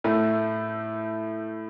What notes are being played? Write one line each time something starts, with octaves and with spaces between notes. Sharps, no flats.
A2 A3